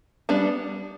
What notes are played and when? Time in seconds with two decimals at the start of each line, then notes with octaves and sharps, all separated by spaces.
0.29 G3 B3 D4